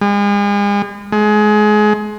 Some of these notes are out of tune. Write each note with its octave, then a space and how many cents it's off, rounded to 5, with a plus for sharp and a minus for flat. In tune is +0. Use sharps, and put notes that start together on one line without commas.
G#3 -40
G#3 +25